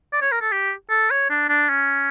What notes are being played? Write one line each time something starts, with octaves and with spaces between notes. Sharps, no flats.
D5
C#5
A#4
A4
G4
A4
C#5
D4
D4
C#4